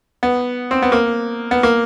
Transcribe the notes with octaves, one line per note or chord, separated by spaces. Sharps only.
B3
C4
B3
A#3
B3
A#3